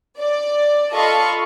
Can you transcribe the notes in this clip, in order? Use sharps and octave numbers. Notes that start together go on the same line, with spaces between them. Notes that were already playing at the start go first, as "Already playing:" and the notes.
D5
F4 A4 D#5 F5 B5 C#6